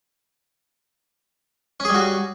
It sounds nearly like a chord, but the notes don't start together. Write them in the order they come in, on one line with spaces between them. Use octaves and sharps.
C#4 G#4 G3 F#4